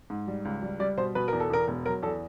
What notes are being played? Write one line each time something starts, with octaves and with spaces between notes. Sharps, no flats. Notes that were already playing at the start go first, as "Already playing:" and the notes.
G#2
G3
C#2
G3
G3 D5
B2 C5
B2 B4
E2 A#4
A4
E2 A#4
E1
F#3 A#4
E2 A4